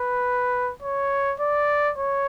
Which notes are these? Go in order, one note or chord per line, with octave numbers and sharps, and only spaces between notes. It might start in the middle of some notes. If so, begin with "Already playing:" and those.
Already playing: B4
C#5
D5
C#5